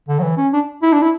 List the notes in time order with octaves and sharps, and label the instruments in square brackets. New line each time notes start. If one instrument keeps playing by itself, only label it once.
[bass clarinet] D3
F#3
E3
C#4
D4
E4
D4
E4